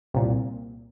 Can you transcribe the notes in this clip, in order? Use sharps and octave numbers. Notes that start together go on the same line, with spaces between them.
C2 A#2